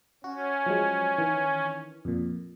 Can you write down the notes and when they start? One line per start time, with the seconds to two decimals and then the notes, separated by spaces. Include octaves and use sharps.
0.24 C#4 F#4
0.66 F3 F#3 G#3
1.18 D#3 E3
2.05 F2 A#2